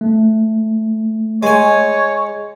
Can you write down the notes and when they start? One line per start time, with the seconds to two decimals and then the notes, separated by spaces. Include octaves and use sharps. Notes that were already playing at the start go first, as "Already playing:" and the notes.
0.01 A3
1.43 G#3 C#5 G#5